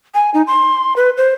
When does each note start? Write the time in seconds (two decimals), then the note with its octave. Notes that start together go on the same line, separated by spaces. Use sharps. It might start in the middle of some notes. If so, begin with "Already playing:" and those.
0.14 G#5
0.34 D#4
0.47 C6
0.96 B4
1.17 C5